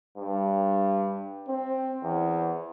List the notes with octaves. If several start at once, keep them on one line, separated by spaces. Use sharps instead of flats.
G2
C4
E2